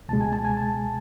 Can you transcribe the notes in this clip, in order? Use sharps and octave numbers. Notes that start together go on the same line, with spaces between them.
C#2 B2 G#3 A5
G#5
A5
G#5
A5